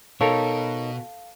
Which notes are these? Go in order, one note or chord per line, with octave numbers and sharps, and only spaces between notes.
B2 D#4 A4 A#4 C#5 F5